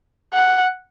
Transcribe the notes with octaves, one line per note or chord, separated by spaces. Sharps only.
F#5